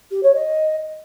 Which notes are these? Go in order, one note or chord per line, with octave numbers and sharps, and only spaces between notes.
G4
C#5
D#5